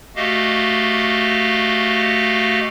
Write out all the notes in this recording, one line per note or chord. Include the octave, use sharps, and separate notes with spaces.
A3 F#4 G4 D#5 F5